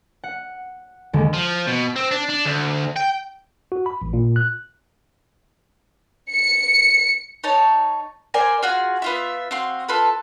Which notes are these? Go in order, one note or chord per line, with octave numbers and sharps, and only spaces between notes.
F#5
D#2 D3 D#3 G#3 A#3
F3
B2
C4
D4
D4
D2
G5
F#4
B5
A1
A#2
F#6
C#7
D#4 C#5 A5
A#4 C5 D5 G#5
F4 F#4 G#4
B3 F4 E5
C4 F#4 F5 C6
F4 A4 B4